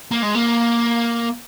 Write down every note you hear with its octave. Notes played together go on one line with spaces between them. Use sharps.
A#3
G#3
A#3